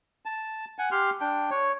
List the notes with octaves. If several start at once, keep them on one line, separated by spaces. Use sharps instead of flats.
A5
F#5 G#5
G4 C6 F6
D4 G5
C#5